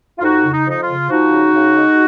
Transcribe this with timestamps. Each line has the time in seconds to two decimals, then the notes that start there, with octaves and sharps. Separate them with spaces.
0.19 F4
0.23 F2 D#4 F#4
0.45 C#3
0.52 D#4
0.66 F2 D#4
0.81 F4
0.88 C#3
1.10 F3 D#4 F#4
1.32 C#3
1.54 C#3
1.76 G#3